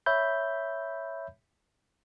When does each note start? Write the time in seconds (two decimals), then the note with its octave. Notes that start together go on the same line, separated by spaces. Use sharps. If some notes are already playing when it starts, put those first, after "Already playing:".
0.06 C#5 E5 B5 G6